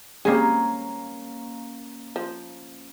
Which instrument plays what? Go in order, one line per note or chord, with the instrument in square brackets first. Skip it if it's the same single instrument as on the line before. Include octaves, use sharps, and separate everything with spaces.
[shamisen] G3 C4 G#4 [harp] A#3 C#4
[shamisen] F3